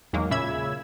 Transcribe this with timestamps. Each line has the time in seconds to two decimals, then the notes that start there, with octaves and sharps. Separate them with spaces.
0.13 E2 D#3 F#3 G#3 A#3
0.31 A#2 C#3 E5 B5 E6 G#6